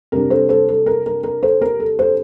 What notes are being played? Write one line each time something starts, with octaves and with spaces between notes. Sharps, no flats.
C3 G3 D4 A#4
A4 C5
A4 C5
A4
A#4
A#4
A#4
A4 C5
A#4
A4
A4 C5